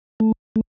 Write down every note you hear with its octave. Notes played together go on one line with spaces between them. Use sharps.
A3
A3